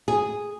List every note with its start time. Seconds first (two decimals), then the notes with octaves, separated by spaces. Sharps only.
0.08 G#4